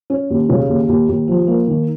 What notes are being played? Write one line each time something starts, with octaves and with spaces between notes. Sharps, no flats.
C#4
D#2
C#3
D#2
D#2
D#2
F3
A#3
D#3